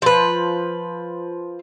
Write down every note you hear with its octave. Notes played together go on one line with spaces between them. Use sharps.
F3 B4